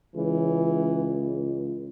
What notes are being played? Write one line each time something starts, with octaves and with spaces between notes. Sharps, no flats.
C#2 E3